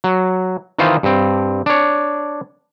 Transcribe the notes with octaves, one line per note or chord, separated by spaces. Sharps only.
F#3
D#3 E3 D#4 F4 C5
G2 C4
D4 C#5